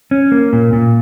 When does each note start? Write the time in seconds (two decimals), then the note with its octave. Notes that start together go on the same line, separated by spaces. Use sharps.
0.11 C#4
0.32 A#3
0.53 A#2
0.73 A#2